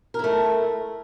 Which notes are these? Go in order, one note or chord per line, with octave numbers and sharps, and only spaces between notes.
A3 E4 A#4